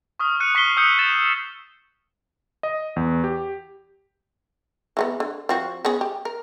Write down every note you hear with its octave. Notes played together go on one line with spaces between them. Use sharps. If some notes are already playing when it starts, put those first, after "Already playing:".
C#6 D#6 F6
F#6 C#7 D#7
C#6 B6 C7 G7
D#6 E6 G6 C#7
A6 E7
D#5
E2
G4
E3 A3 B3
D3
F3 C4 F#4
B3 C#4 G#4
G4
A#4